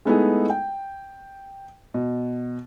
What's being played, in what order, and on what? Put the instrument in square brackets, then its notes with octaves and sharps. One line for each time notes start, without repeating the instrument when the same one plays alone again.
[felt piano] G#3 A3 B3 D#4 E4 G#4
G5
B2